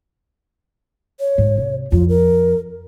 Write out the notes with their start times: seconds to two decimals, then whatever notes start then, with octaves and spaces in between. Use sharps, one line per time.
1.20 C#5
1.38 G#2
1.57 C3
1.92 F2 F4
2.09 A#4